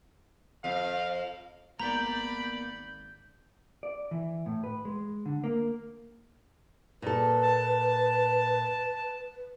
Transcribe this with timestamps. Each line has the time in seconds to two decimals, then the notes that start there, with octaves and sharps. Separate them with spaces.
0.64 F2 F5
1.80 G#1 A#3 B3 D5 A#5 B5 G6
3.83 D5
4.11 E3
4.46 A2
4.64 B4
4.85 G#3
5.26 D3
5.44 A#3
7.02 A#2 A4 B4
7.42 A5